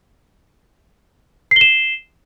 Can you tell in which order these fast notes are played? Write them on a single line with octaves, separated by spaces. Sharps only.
C7 G7 E7